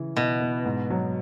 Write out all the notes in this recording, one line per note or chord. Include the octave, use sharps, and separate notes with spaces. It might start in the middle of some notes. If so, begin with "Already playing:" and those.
Already playing: C#3 E3
B2 E4
B3
G#2
F#3